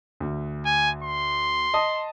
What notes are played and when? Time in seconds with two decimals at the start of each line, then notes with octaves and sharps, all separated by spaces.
0.20 D2
0.65 G#5
1.03 C6
1.74 D#5 A5 D#6